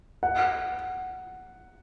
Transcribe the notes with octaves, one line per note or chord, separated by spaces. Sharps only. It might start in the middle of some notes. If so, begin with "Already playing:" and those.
F#5